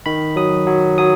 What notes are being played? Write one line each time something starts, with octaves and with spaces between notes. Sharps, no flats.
D#3 B5
F#3 D#6
F#3
F#3 D#6